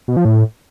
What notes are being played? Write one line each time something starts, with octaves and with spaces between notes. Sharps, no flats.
B2
F3
A2